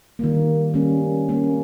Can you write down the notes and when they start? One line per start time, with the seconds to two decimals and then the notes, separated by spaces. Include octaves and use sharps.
0.19 D#3 G3 A#3
0.74 G3 A#3 C#4
1.29 G3 A#3 C#4